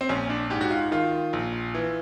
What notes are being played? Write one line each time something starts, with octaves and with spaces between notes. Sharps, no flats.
C4
A#1 C#4
D4
G#2 G4
F#4
F4
D#3 F4
A#1
E3